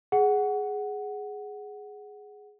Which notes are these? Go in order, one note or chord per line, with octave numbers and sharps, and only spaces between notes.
G#4 F#5